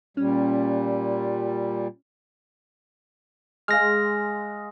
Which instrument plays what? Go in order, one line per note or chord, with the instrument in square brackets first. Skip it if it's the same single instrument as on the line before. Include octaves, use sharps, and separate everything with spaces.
[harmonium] A#2 G3 [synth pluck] C#4
[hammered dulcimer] G#3 F5 [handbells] F6 A#6